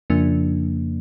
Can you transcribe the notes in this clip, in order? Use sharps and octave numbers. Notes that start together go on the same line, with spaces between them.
F2 C#3 F3 A#3 D4